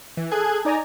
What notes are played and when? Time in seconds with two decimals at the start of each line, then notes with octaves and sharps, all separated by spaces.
0.17 E3
0.31 G#4 A4 F#6 G#6
0.65 D#4 D5 G#5 A#5